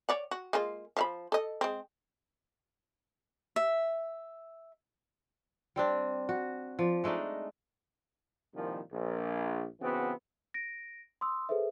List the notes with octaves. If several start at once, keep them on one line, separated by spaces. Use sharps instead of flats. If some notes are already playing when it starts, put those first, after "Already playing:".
C#5 D5 F#5
F#4
G#3 A#3 F4
F3 F5 B5
A4 D#5
G#3 C4
E5
G3 C4 D4
F#4
F3 D5
G#3 A3 D4 D#4
C2 A#2 D#3 F3
A#1
C#3 E3 B3 C4 F#4
A#6 D7
C6 D#6 E6
G#4 A4 B4 C5 E5